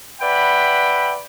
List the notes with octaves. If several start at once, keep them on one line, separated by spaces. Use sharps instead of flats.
B4 D5 E5 F#5 G5 B5